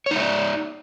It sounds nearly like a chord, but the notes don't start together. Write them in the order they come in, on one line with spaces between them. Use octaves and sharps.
C#5 D#4 E5 D5